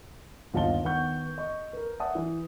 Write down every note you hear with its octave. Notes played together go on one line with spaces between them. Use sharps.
G1 D#2 F4 D#5 A5 G7
D#3 B3 F#5 C#6 G6
D#5 C#6
A#4 B4
D5 E5 F#5 A5 D#6
E3